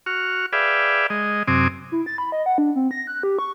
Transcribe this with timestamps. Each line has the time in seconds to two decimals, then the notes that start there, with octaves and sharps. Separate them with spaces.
0.06 F#4 C#6 F6
0.53 G#4 B4 D5 E5 F5 G5
1.10 G#3 D#5
1.48 F#2 C3 C4 G#5 D6 D#6
1.92 E4
2.06 A6
2.18 B5
2.32 D#5
2.46 F#5
2.58 D4
2.76 C4
2.91 A#6
3.07 F#6
3.23 G4
3.39 C#6